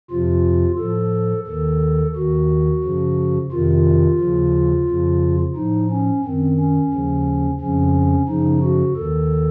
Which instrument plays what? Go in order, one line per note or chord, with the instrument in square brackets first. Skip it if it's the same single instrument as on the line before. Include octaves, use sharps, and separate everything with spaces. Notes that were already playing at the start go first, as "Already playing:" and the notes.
[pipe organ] F2 C3 F3 F4
A2 F3 A4
D#2 D#3 A4
D#2 D#3 F#4
F#2 C#3 F3
F2 C3 D#3 F4
D#2 C#3 F3
F2 C#3 F3
A2 F3 D#4
C#4
F#2 D#3 C4
C#4
D#2 C#3 F3
F2 C#3 F3 C#4
F#2 C#3 F3 D#4
F#4
D#2 D#3 A4